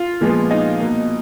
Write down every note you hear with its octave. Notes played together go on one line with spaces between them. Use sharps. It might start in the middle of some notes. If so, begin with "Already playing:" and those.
Already playing: F4
A#2 F3 G#3 B3
D#4
B2 A#3